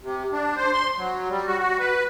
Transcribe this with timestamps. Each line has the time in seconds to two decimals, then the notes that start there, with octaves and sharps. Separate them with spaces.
0.02 C3
0.32 D4
0.56 C5
0.72 C6
0.98 F#3
1.29 G3
1.46 F#4
1.59 F#4
1.80 B4